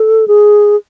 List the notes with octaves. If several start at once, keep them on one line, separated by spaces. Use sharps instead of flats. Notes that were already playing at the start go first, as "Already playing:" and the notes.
Already playing: A4
G#4